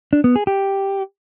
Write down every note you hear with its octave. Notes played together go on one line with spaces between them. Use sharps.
D4
B3
G#4
G4